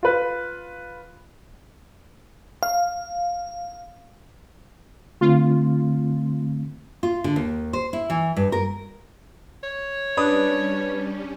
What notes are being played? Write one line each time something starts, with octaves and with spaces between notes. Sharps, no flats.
F4 B4
F5
D3 A3 C4 F4
F4
D3
D#2
C5
E4
E3
G2
A#4
C#5
G3 C#4 D4 B4 D#6